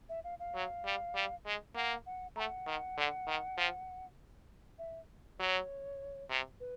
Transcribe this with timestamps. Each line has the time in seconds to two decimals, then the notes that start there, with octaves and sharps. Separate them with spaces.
0.09 E5
0.24 F5
0.39 F5
0.55 F#3
0.85 G3
1.15 G3
1.46 G#3
1.75 A#3 F#5
2.06 F#5
2.36 A3 F#5 A#5
2.67 D#3
2.97 D3
3.27 D#3
3.57 F3
4.79 E5
5.39 F#3 C#5
6.30 C3
6.60 B4